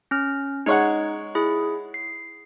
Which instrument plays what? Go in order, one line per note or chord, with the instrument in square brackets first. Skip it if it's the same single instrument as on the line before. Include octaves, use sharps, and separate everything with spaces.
[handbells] C#4 F6
[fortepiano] G#3 C#5 F#5 [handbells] D#4
[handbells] E4 G#4
C7